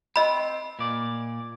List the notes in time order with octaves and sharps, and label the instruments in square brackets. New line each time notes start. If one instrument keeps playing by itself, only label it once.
[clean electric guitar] C4 [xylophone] D#5 B5
[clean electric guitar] A#2 D5